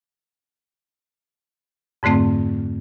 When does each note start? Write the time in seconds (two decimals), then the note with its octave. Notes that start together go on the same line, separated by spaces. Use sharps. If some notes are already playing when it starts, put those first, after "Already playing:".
2.03 F2 G#2 D3 A3 C4